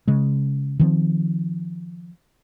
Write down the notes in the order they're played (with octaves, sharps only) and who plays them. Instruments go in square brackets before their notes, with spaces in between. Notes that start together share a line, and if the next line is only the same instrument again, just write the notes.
[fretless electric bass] C#3 G#3
D#3 F3 C4